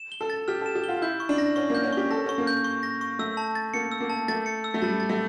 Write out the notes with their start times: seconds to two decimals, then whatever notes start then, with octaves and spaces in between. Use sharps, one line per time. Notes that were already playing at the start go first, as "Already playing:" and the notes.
Already playing: E7
0.12 G7
0.21 A4
0.30 A6
0.48 G4 F6
0.61 A4
0.66 E7
0.75 G4
0.84 F4 G7
1.02 E4 G6
1.20 C#6
1.29 D4
1.38 A#6
1.56 C#4 C#6
1.70 A#3
1.75 G6
1.84 C#4
1.92 G4 C#6
2.11 A4 A#6
2.26 C#4 C#6
2.38 A#3
2.47 G6
2.64 C#6
2.83 A#6
3.01 C#6
3.19 A3 E6
3.37 A5
3.55 A6
3.74 A#3 C#7
3.92 E6
4.00 A#3
4.10 A5
4.28 A3 A6
4.46 C#7
4.64 E6
4.74 A3
4.82 G3 A5
5.00 A6
5.09 A3